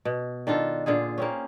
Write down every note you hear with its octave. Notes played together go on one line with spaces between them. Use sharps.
B2
D#3 D4 F4 A4
A#2 D3 F4 G#4
A#3 C4 C#4